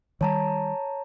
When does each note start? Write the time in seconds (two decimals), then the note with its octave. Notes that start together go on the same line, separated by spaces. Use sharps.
0.21 D#3 G3 C#5 A5 A#5